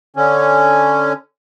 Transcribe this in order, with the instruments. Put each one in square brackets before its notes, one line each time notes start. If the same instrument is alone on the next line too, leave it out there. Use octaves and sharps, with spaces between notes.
[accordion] D3 C#4